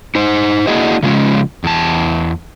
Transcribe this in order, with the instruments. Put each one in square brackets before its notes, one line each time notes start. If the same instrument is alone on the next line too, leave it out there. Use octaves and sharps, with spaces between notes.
[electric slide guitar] D#4 C5
A#3 D4 E4 F#4 G#4 D#5
C#3 F3 G#3 C#4
E2 A5